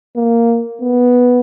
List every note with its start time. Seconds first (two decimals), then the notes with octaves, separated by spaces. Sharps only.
0.16 A#3
0.81 B3